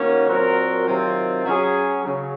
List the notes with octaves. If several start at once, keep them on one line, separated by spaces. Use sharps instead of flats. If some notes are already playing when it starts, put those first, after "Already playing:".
Already playing: D#3 A#3 C#4 F#4
A#2 F#3 C4 F#4 A#4
C3 D#3 F#3 C4 F4
F#3 C#4 G#4
C#3 F#3